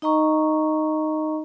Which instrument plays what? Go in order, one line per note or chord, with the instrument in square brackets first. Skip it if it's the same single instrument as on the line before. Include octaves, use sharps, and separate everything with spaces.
[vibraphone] D#4 D#5 A#5 C#6